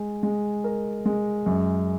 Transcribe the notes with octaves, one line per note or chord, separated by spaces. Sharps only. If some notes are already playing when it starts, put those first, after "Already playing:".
Already playing: G#3
G#3
A#4
G#3
F#2